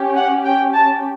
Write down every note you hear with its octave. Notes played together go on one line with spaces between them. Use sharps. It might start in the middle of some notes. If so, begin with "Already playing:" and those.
Already playing: C#4 G4
F#5
G5
A5